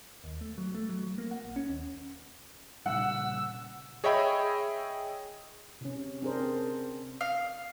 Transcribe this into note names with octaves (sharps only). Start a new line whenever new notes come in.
D#2
A3
F#3
A3
F#3
F#3
A#3
F#5
A#1
C#4
D#2
A#2 C#3 G3 F#5 E6
G#4 C#5 D#5 E5 G5 B5
C3 C#4
C4 D4 G#4 A#4 C5
F5